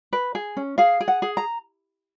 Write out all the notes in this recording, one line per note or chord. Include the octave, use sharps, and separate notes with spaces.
B4
G#4
C#4
G#4 F5
G#4
F#5
G#4
A#5